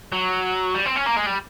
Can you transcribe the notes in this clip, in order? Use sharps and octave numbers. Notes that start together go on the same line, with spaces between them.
F#3
G3
C4
C#4
A#3
G#3
G3